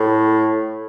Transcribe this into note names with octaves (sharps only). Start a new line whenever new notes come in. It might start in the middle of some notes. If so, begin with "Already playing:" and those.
Already playing: A2